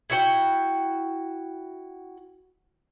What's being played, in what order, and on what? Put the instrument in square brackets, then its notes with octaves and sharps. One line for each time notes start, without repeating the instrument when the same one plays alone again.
[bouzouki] E4 F#4 G5